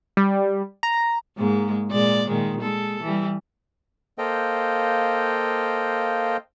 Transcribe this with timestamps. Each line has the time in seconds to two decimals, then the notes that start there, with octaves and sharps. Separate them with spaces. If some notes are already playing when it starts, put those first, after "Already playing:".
0.17 G3
0.83 A#5
1.38 G#2 G#3 A#3
1.90 A#2 G#3 D5
2.27 A#2 D#3 G#3
2.61 G#3 A4
3.03 E3 G3
4.18 A#3 A4 C5 D#5 F5 G5